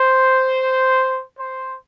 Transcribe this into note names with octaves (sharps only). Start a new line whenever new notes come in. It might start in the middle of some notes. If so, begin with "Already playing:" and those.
Already playing: C5
C5